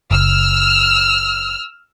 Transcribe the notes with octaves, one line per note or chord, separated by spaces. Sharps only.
F#1 E6 F6